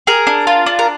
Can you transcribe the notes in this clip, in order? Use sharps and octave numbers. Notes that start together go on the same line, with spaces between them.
G#4 A#4
D4
F4
D4
A#4